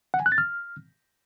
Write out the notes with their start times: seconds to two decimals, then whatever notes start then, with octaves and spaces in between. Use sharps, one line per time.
0.14 F#5
0.20 G#5
0.26 F#6
0.32 A6
0.38 F6